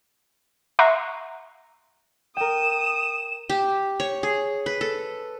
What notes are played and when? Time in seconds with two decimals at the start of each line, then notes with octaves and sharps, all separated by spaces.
0.79 E5 F#5 A#5 C6 C#6
2.37 A#4 G5 D#6 E7
3.49 G4
4.00 C#5
4.23 G#4
4.66 B4
4.81 A4